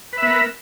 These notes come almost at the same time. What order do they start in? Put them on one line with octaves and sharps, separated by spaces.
B4 E5 B3 A#4